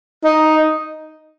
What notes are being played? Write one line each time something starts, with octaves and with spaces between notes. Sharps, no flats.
D#4